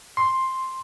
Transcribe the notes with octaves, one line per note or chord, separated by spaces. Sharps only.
C6